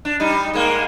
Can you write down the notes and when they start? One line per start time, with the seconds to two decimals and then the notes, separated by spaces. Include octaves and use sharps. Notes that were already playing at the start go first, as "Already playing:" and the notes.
0.05 D4
0.20 G3 D#4
0.53 G#2 G#3 A#3